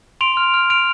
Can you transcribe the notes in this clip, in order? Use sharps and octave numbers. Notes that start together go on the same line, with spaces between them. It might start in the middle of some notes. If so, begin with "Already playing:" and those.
C6 D7 F7
F6
F6
F6 D7 F7